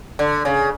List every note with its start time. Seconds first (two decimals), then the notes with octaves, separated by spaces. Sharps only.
0.19 D3
0.45 C#3